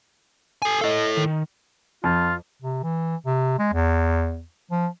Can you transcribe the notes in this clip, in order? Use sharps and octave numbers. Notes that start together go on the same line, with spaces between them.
A4 G#5
E4 A4 D#5 F5
D#3
F2 F4
C3
E3
C3
G#3
E2
F3